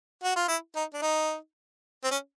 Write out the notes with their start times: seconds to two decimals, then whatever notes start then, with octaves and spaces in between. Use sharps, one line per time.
0.24 F#4
0.36 F4
0.48 E4
0.76 D#4
0.94 D4
1.02 D#4
2.04 C4
2.11 C#4